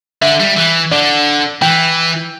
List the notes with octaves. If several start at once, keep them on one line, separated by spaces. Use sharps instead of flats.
D3 E5
G3
E3
D3 D5
E3 G5